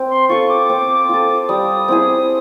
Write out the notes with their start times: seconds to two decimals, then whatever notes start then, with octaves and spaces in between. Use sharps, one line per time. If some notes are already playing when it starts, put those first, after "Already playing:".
Already playing: C4
0.10 C6
0.29 F4 A4 C#6
0.49 D6
0.69 C4
1.09 F4 A4
1.48 G3 D#6
1.88 C4 E4 G#4